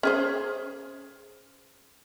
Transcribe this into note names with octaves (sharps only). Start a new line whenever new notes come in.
C#4 G#4 C5